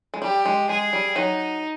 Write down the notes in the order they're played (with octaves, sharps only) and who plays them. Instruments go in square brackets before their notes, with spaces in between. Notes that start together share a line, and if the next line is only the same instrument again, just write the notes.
[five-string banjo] G#3
[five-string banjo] G3 [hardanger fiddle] G4
[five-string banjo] G#3
[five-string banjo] G#3 [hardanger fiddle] G#4
[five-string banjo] G3
[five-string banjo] F#3 [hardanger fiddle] D#4